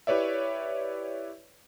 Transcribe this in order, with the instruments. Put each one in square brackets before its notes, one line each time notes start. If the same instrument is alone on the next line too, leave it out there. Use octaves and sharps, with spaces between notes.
[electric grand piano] E4 G4 B4 C#5 D5 E5